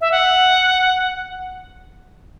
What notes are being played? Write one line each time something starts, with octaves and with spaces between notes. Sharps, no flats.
E5
F#5